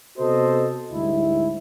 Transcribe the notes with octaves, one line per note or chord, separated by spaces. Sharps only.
C3 B3 F#4 A4 C5 D#5
D2 G#2 G3 E4